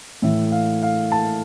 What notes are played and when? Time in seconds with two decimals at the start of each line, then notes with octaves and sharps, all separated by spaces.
0.22 A2 E3 E5
0.52 F5
0.83 F5
1.12 A5